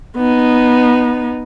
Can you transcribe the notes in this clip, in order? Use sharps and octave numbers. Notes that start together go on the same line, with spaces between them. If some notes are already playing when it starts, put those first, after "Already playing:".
B3 D#4